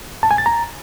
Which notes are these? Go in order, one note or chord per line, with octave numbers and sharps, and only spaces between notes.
A5
G#5
A6
A#5